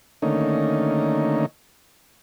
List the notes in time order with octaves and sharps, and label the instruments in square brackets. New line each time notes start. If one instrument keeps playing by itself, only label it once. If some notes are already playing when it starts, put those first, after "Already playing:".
[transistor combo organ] D3 D#3 A3 A#3 C#4 D#4